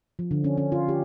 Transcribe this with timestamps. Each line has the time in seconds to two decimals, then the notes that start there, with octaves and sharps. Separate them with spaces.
0.19 F3
0.31 D3
0.44 C#4
0.57 C#4
0.72 F4
0.89 G4